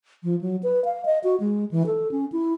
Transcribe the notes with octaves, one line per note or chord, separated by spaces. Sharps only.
F3
F#3
B4
F5
D#5
F#4
G#3
E3
A4
C#4
E4